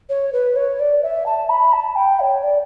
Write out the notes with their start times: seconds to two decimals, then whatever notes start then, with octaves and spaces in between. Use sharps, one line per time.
0.09 C#5
0.32 B4
0.56 C#5
0.79 D5
1.02 E5
1.26 A5
1.49 B5
1.72 A5
1.95 G5
2.20 C#5
2.43 D5